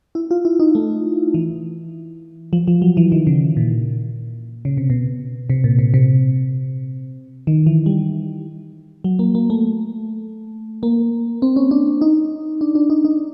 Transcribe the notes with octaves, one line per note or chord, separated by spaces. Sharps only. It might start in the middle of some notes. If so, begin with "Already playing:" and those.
E4
F4
E4
D#4
A3
E3
F3
F3
F#3
E3
D#3
C#3
A#2
C#3
C3
B2
C3
A#2
C3
C3
D#3
E3
G3
F#3
A#3
A#3
A3
A#3
C4
C#4
D4
D#4
D4
D4
D#4
D#4